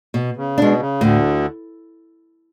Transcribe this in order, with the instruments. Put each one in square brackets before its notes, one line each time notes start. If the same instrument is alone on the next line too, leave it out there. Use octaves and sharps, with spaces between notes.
[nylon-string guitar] B2
[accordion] C#3
[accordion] B2 [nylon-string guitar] G#3 D4
[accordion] C#3
[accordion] D2 D3 [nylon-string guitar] A2